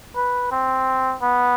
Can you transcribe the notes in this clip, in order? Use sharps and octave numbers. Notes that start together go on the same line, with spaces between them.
B4
C4
B3